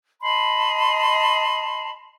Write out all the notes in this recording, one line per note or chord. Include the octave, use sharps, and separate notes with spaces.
D#5 A5 B5 C6